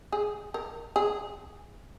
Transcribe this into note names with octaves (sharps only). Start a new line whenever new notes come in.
G#4
A#4
G#4